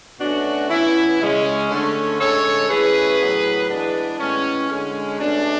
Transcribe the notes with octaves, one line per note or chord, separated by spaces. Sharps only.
B2 A3 C#4 D4 F#4
E3 B3 C#4 E4
C#3 G#3 C#4
D3 A3 C#4
D3 G#3 C#4 A4 C#5
E3 A3 C#4 G#4 B4
A2 F#3 B3
E3 G#3 B3 D4
A2 G#3 B3 C#4
D3 G#3 C#4
B2 A3 C#4 D4